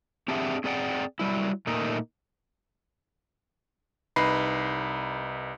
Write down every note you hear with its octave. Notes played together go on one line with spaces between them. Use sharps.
C4 D4 G4 G#4 E5 F#5
C4 G#4 D5 F#5 G5
F#3 G3 E4
A#2 A3 A#3 D#4 A#4
C2 D#4 B4 B5 C7